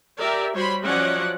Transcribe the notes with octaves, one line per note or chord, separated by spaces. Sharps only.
G4 A#4 D5 E5
G3 F#4 C5 C#5 B5 C6
F3 F#3 C#4 D5 D#5 F#5